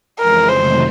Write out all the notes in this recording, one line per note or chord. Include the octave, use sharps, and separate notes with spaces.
F2 C#3 E3 G#3 C4 A#4
F2 C3 D#3 F#3 A3 C5